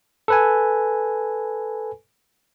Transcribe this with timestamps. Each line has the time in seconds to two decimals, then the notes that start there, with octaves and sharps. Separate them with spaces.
0.28 A4 B4 G#5